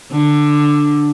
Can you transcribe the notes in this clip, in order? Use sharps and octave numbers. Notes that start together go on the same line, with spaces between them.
D3